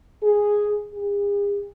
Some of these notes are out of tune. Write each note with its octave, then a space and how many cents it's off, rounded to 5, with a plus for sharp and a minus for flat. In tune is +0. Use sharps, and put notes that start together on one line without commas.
G#4 -5
G#4 -45